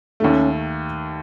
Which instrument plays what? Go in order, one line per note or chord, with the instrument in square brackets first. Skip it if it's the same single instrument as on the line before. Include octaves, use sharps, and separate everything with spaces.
[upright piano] D#2 D#3 A3 [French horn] C#4